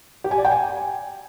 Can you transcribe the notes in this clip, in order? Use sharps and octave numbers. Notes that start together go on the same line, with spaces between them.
G4
G#5
D5
G5
G#5